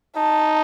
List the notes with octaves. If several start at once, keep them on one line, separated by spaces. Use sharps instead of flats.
D#4 A5